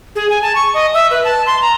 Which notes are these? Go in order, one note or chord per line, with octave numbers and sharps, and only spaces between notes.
G#4
G#5
A5
C#6
D#5
E5
B4
A5
C6
A#5